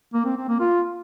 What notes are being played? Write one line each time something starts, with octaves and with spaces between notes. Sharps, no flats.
A#3
C4
C4
A#3
F4